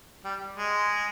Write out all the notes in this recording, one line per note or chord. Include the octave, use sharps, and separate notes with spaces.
G3
G#3